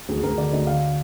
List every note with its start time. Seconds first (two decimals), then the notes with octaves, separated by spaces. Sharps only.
0.09 D2 G#4
0.23 D2 A#4
0.38 D3 D5
0.53 D2 D#5
0.67 D3 F5